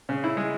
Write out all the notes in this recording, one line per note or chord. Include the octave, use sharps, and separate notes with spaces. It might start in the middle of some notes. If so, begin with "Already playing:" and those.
C#3
E4
G#3